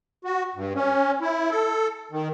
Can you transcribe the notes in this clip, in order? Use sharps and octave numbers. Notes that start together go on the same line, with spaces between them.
F#4
G2
C#4
E4
A4
D#3